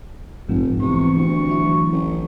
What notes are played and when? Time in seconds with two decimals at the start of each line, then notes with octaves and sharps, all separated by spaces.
0.48 F1 A#1 G#2 F3
0.82 C3 E3 B3 C#6
1.15 D2
1.48 E3 F#3 E4
1.92 A1